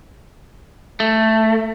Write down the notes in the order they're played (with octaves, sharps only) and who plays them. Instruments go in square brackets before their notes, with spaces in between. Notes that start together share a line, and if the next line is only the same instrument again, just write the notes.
[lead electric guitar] A3